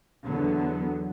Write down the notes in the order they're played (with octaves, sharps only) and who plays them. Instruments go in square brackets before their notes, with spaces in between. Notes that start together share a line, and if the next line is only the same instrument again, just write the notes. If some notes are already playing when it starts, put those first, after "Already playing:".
[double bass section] E2 D3 F#3 B3